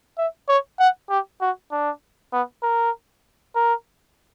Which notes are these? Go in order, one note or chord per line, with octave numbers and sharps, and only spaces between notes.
E5
C#5
F#5
G4
F#4
D4
B3
A#4
A#4